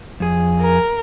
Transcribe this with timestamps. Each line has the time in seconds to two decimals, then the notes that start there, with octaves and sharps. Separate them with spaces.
0.20 F2 G#4
0.62 A#4